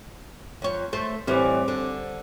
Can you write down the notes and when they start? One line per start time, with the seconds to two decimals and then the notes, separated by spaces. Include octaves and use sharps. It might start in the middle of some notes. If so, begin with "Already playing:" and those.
0.62 F2 C#5
0.93 A3 C5
1.27 A2 E3 G3 C4 C5 D6
1.68 D3